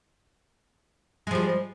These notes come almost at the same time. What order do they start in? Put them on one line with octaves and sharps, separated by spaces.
G#3 F3 G3